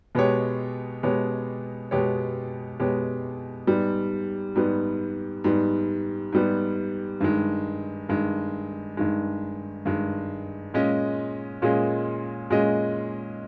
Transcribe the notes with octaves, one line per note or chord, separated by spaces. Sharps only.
B2 G#3 B3 G4 C#5
B2 G#3 B3 G4 C#5
B2 G#3 B3 G4 C#5
B2 G#3 B3 G4 C#5
G#2 G3 B3
G#2 G3 B3
G#2 G3 B3
G#2 G3 B3
G2 D#3 G#3
G2 D#3 G#3
G2 D#3 G#3
G2 D#3 G#3
A#2 G#3 C#4 G#4 D#5
A#2 G#3 C#4 G#4 D#5
A#2 G#3 C#4 G#4 D#5